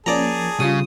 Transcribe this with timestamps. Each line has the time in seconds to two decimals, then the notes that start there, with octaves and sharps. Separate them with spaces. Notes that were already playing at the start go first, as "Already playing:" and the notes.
0.06 F3 A#3 C#4 G#4 D5 A5 A#5
0.60 C#3 G3 F4 D#6